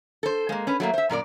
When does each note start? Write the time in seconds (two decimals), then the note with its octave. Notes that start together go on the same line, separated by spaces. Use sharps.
0.23 A4 C5
0.49 G#3 A#3
0.67 C#4 B4
0.80 F#3 A3 A#3
0.94 C5 E5
1.10 F#2 A#2 A#4 D5